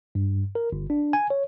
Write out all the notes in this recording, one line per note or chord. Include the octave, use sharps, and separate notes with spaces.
G2
A#4
G1
D4
G#5
C#5